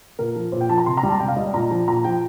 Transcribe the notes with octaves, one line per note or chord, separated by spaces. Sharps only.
A#2 A#4
F3
A#2 C5
G5
F3 A5
A#5
C3 C6
A#5
G3
A5
C3 G5
F5
G3 D#5
D5
A#2 A#5
F3
A#2 A#5
F3 G5